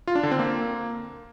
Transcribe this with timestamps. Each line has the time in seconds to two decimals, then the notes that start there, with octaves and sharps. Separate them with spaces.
0.07 F4
0.15 D4
0.23 D3
0.31 C4
0.39 A#3